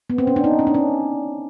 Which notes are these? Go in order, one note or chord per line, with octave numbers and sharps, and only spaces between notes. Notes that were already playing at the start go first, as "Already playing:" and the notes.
B3
C4
C#4
D4
D#4
C#4
D4
C#4